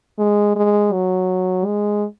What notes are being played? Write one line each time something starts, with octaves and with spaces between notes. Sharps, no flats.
G#3
G#3
F#3
G#3